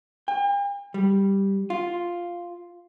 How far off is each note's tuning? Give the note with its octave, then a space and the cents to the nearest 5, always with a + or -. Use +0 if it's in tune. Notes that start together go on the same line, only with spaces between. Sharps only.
G5 +45
G3 +0
F4 +0